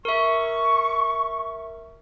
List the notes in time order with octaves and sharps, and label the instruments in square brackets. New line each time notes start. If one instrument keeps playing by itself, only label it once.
[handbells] A#4 E5 [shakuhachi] C#6